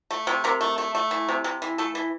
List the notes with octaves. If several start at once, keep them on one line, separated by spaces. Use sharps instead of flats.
A3
C3
C3 A#4
A3
A3
A3
E3
C3
C3
E3
A3 A4
E3